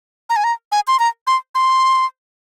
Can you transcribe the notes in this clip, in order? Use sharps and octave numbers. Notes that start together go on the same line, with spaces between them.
A#5
G#5
A#5
G#5
C6
A#5
C6
C6